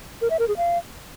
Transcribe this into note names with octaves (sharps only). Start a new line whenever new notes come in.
A#4
E5
A#4
G#4
F5